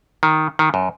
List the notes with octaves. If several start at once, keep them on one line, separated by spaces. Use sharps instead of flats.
D#3
D#3
F#2